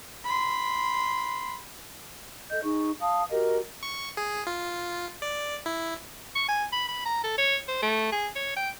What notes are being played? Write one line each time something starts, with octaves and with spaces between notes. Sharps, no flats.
B5 C6
A4 D#5 G6
D#4 G#4 C#6
F5 A5 D#6
F#4 G4 A#4 D#5
C#6
G#4
F4
D5
E4
C#6
G#5
B5
B5
A#5
A4
C#5
C5
A3
G#4
C#5
G5